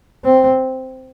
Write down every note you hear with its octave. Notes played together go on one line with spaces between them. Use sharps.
C4